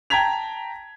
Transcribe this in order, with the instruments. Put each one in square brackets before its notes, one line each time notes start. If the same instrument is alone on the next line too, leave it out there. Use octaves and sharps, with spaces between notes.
[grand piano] G5 A5 A#5 G#6 B6 F7